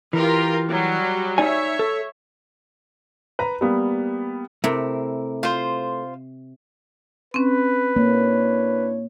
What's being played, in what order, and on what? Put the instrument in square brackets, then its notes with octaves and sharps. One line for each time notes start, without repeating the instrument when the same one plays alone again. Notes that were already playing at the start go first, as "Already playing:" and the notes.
[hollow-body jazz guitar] E3 [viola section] F4 G4 A#4
[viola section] F#3 G3 F#4
[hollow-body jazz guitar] D#4 D5 G#5 [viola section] C#5 E5
[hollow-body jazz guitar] A4
[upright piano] B4 A#5
G3 A#3 B3
[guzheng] C3 [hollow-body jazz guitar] A3 E4 A#4
[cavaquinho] F4 C5
[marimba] C4 C#4 [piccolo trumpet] B4
[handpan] A#3 [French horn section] D4 E4 C#5